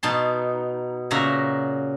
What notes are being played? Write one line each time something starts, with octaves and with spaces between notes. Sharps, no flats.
B2 D#4 A5 C6
A#2 C#3 F#4 E5 A#5